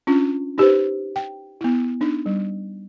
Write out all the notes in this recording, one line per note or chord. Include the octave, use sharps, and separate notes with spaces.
C#4 D4 F4
D#4 G4 B4 C5
G5
B3 E4
D4 D#4
G3